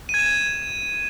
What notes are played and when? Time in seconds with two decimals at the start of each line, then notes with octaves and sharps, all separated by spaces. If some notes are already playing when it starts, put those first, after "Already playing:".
0.09 D#7
0.14 G#6
0.19 E7